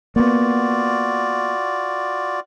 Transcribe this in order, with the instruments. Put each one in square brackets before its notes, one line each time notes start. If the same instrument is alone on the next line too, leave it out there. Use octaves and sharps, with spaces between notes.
[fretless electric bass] A#3 B3 [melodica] F4 F#4 D5